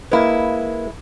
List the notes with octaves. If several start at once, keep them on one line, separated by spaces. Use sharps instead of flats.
G#3 A#3 E4 B4